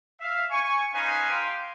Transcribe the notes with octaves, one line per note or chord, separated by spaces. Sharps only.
E5 F5
G#5 C#6
C#4 D#4 B4 C5 F5 G#5
G4 F5 G5 C6